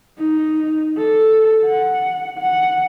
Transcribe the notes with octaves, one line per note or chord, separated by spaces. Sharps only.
D#4
A4
F#5
F#5